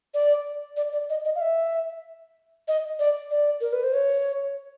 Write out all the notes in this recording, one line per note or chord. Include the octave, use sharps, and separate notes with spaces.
D5
D5
D5
D#5
D#5
F5
E5
D#5
D5
D5
A#4
B4
C5
C#5